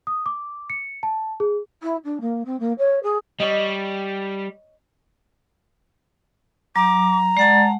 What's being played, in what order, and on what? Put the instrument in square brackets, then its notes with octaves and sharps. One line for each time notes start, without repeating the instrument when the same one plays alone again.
[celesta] D#6
D6
C#7
A5
G#4
[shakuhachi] E4
D4
A#3
C4
A#3
C#5
G#4
[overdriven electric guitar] G3 [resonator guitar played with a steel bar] C#5 D#5
[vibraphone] F#3 [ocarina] A#5 [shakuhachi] D6
[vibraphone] G#3 F#5 A5 [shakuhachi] D5